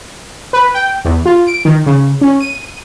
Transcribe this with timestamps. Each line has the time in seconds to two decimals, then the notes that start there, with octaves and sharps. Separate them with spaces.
0.53 B4
0.74 G5
1.05 E2
1.26 F4
1.47 D7
1.65 D#3
1.86 C#3
2.21 C#4
2.41 D#7